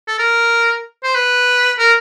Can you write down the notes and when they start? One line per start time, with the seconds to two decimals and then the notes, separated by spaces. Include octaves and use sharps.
0.08 A4
0.19 A#4
1.03 C5
1.15 B4
1.79 A#4